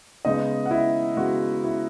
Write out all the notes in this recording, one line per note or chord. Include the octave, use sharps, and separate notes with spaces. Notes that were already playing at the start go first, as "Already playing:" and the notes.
C#3 G#3 B3 D#4 D#5
F#5
E4 E5
C#3 G#3 B3 F#4
E4